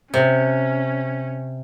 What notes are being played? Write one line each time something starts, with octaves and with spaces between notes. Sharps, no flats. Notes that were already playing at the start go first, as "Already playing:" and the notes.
C3 C#4